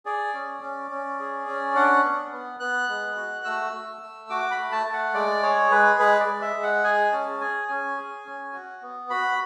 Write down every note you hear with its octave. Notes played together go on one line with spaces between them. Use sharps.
G#4 D5
C#4
C#4
C#4
G#4
C#4
D4 F#5
B3
B3
B3 F#6
G#3
F#4
A3 E6
A3
A3
F#4 D6
B5
A3
A5
A3
F#5
G#3 D5
G#4 C#5
G#3 B4
G#3 B4
D5
G#3
E5
G#3
F#5
G#4 G#5
C#4 A5
G#4 G#5
C#4 G#5
G#4
C#4
F#4
B3
F#4 B5